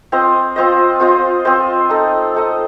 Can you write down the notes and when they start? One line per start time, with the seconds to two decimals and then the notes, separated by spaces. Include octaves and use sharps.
0.12 C4 F4 C5 D#5
0.56 C4 F4 C5 D#5
1.00 C4 F4 C5 D#5
1.45 C4 F4 C5 D#5
1.89 D#4 A4 D#5
2.34 D#4 A4 D#5